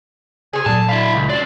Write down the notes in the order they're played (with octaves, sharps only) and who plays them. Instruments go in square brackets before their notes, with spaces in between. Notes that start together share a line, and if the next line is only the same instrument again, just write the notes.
[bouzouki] C3 D#3 G#4 [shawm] G#5
[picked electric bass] A#2 F#3 [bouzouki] D3 [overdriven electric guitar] A5
[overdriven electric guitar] E4 F5 [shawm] B5
[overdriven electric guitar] C#2
[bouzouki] F#3 [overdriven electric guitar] C#4 D5 [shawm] C6